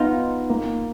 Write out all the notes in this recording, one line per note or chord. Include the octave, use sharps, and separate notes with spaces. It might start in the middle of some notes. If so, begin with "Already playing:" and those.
Already playing: B3 D#4 F4
A#3